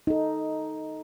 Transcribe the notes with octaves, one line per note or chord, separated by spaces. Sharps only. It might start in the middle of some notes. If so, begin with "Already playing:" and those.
D#4 A4